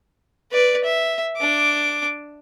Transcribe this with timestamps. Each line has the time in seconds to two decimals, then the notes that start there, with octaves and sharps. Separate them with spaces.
0.52 B4 D5
0.84 E5
1.37 D4 D6